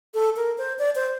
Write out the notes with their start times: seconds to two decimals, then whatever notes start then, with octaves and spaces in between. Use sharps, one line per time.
0.14 A4
0.36 A#4
0.58 C5
0.79 D5
0.95 C5